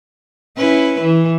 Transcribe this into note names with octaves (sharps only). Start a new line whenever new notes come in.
C#4 E4 B4
E3